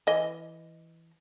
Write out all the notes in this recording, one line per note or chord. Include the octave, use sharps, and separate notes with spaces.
E3 D#5